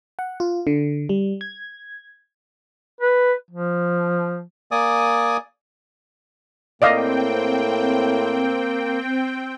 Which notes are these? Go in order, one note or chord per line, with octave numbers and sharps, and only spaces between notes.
F#5
F4
D3
G3
G#6
B4
F3
A#3 D5 G#5 D#6
A2 A#3 C4 D5 D#5 F5 G5